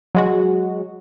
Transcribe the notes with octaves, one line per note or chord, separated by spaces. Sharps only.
F#3 G#3 F#4